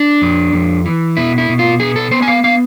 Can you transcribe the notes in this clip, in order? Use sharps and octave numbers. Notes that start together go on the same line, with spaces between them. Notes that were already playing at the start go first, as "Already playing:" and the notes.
Already playing: D4
F2
F2
E3
B2 E4
E4
B2
F4
B3 G#4
A4
B3 C5
G#5
F5
B3 F5